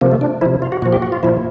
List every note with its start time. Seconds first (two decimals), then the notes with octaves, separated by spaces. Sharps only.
0.01 C3 F3 A#3
0.12 A3
0.21 D4
0.41 C3 F3 E4
0.62 F4
0.72 F#4
0.82 A#2 F3 F#4
0.93 G4
1.02 F#4
1.12 F4
1.23 A#2 F3 E4